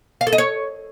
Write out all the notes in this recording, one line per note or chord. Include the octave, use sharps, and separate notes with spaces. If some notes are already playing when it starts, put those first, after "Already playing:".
F5
A4
D#5
C#5